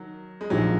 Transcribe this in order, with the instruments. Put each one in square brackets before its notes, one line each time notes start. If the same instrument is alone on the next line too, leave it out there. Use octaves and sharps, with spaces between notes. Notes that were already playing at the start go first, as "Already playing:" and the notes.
Already playing: [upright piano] D#3 F#3
G#3
[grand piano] A#1 A#2 F3 [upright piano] D#3 F#3